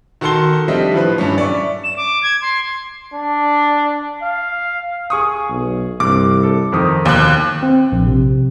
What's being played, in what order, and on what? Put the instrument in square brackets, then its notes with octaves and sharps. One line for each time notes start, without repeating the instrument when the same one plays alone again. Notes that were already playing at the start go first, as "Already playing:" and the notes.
[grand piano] D#3 F#4 A4 A5 C6 G7
F3 G3 C4 D4 D#5 E5
A2 F3 B4
G2 C#4
D5 E5 C#6
[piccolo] E7
D6
G#6
C6
[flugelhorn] D4
F5
[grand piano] G#4 C#6 D#6
[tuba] B1
[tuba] C2 [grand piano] G2 [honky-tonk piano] D6
[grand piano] A4
F2 D#3 D#6
[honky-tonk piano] D#2 F#6 [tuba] B2
[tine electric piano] C4
A#1
C3